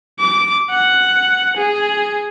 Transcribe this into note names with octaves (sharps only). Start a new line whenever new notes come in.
D6
F#5
G#4